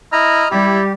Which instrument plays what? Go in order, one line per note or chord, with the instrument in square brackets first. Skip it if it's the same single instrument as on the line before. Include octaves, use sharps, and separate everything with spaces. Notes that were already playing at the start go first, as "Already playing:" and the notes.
[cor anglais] E4 [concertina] D#5 A#5 F6
[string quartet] G3 [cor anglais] E4 [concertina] G4